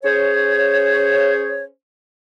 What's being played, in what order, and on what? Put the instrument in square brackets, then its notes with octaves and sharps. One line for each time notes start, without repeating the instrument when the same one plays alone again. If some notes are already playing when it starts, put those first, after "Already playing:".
[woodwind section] C#4 G#4 C5 C#5